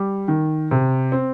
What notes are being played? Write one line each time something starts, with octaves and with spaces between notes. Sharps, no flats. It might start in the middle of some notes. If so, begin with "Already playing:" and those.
Already playing: G3
D#3
C3
C4